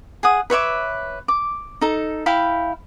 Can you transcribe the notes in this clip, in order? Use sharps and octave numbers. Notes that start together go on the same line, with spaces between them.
G#4 F#5 D#6
B4 C#5 E5 D6
D6
D#4 A4
E4 F5 G5 B5